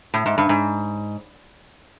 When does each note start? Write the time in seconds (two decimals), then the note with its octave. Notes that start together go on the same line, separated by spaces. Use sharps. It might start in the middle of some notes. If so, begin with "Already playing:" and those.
0.14 A2
0.26 G#2
0.38 G2
0.49 G#2